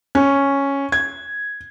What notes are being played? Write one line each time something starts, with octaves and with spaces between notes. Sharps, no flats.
C#4
G#6